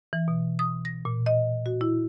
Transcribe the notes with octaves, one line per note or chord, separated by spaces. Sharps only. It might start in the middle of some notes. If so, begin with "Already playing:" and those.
E3
B2
D#6
A#6
A#2
D#5
F#4
E4